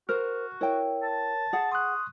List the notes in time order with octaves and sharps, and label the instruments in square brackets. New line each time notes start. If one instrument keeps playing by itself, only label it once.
[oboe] F#4 [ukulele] A#4 C5 [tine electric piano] F6
[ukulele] E4 G5 [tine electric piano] A#4 C#5
[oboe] A5
[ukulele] G#4 F#5
[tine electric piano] C6 C#6 F#6 [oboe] D#6